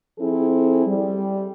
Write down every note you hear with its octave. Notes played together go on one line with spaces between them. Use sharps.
F3 C4 E4 G#4 A4
G3